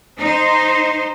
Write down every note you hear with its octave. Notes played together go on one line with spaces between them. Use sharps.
D#4 C5